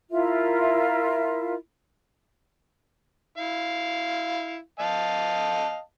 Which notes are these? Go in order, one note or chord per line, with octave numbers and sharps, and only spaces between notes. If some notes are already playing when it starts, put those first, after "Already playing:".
E4 F4 A#4 E5
E4 F5
D#5 F5 A5